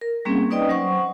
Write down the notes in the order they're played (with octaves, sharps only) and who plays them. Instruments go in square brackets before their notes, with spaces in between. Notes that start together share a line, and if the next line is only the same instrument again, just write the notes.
[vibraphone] A#4
G3 A#3 C4 C#4 G#4
D#4 B4 D5 D#5 G5 D#6
F#3 C5 F#5 C#6